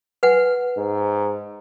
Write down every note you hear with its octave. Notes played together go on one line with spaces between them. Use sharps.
B4 F#5 G#5
G#2